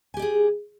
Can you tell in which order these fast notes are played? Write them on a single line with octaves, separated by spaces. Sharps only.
G#5 G4 D5 G#4